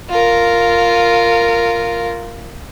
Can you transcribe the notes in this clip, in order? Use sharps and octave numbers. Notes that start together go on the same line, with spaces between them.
F4 A#4